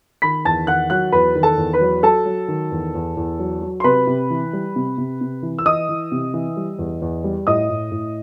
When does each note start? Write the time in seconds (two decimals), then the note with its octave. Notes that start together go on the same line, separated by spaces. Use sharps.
0.22 D#3 B5 B6
0.45 E2 A5 A6
0.67 D#3 F#5 F#6
0.90 F#3 F#5 F#6
1.12 E2 B4 B5
1.35 D#3
1.43 A4 A5
1.58 E2
1.73 B4 B5
1.81 F#3
2.03 F#3 A4 A5
2.26 F#3
2.48 D#3
2.72 E2
2.95 E2
3.17 E2
3.39 F#3
3.62 F#3
3.80 C6
3.84 C3 B4 B5
4.07 C3
4.30 E3
4.53 G3
4.76 C3
4.98 C3
5.21 C3
5.43 E3
5.59 E6
5.66 E3 D#5 D#6
5.89 E3
6.12 C3
6.34 E3
6.57 G3
6.79 E2
7.02 E2
7.24 G3
7.47 A2 D#5 D#6
7.70 A2
7.92 A2